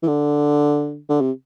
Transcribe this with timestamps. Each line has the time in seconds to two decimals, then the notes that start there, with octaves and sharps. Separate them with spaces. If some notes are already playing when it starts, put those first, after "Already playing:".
0.03 E3
0.08 D3
1.09 D3
1.21 C3